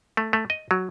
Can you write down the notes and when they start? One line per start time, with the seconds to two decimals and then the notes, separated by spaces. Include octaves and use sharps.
0.17 A3
0.33 A3
0.50 D#5
0.71 F#3